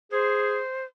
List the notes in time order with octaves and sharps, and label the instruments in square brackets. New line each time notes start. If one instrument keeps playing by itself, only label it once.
[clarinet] G#4 [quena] C5